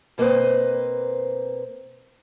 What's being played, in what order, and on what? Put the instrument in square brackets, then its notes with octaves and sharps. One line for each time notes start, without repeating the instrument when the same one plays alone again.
[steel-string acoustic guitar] B2 A#3 C4 B4 C5